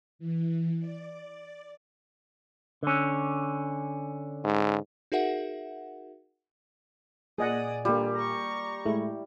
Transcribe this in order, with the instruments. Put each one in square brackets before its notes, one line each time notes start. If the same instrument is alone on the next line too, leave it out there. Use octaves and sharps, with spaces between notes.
[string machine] E3
D5
[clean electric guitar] D3 C#4
[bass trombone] G#2
[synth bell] D#4 F#4 G#4 A#4 E5 F#5
[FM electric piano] A#2 G#5 [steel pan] G#4 D#5 F#5 [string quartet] D5 D#6
[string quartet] D3 [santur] G3 [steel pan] A#3 F4
[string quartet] A#5 C#6
[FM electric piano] A2 G#3 A3 [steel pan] E4